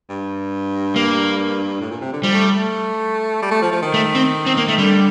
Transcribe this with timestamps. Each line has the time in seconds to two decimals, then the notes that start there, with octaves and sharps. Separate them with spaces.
0.09 G2
0.96 A#3
1.81 A2
1.91 A#2
2.01 C3
2.13 D3
2.23 F3 G3
2.34 A3
2.54 A3
3.42 G3
3.51 A3
3.62 F3
3.72 F3
3.82 D#3
3.94 A3
4.15 C4
4.46 C4
4.57 A#3
4.68 A3
4.78 D3 G3